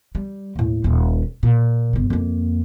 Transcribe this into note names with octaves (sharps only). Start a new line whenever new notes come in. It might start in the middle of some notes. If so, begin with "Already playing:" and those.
G3
D#2 A2
D#1 C#4
A#2
G1 C#3
F2 A#3